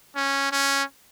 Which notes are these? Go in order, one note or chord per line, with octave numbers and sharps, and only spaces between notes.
C#4
C#4